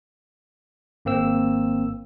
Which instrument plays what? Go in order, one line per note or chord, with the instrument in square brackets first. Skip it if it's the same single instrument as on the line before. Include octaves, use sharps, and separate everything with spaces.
[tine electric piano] G#1 A#3 C4 E6